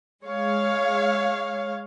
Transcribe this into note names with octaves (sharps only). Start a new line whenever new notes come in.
G#3 C#5 F5